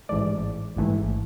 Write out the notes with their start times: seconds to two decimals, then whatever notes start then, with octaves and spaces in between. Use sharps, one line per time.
0.09 A1 G#2 E3 A3 D5
0.76 A1 G#2 E3 A3